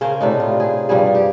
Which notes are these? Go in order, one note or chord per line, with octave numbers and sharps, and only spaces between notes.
C#3 C#4 A#4 C5
A2 C3 D4 D#4
F4
G#4
G2 F3 G3 G#4
G4